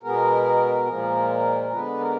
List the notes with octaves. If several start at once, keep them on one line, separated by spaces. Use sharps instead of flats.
B2 G#3 B3 A#4
A#2 F3 G#3
D3 G#3 B3 B4
A#4